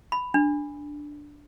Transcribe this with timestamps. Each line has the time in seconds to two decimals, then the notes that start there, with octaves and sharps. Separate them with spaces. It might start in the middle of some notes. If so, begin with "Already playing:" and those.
0.12 B5
0.34 D4